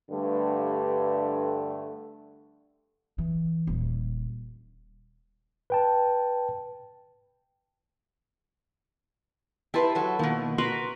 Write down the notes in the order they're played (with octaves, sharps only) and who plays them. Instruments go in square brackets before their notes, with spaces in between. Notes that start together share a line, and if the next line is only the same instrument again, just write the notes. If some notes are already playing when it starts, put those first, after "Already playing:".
[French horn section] G2 D3 A3
[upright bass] E3
D#1
[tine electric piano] B4 G5 A5
[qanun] E4 [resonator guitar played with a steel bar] G4 B4 [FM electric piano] E5 A5 C6
[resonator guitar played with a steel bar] F#3 A4
[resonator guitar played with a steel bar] B2 F3 [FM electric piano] D#3 A#3
[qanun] F#4 A#4 B4 [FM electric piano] C6